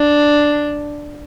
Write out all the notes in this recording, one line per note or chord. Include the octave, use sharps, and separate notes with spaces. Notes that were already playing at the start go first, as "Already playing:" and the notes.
Already playing: D4